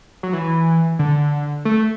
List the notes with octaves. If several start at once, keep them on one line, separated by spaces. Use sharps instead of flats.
F#3
E3
D3
A3